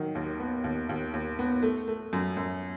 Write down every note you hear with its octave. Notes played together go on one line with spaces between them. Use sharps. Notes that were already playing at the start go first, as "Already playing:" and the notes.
Already playing: D#3 F#3
D#2
B3
D#2
D#2
D#2
B3
A3
A3
F#2
F#2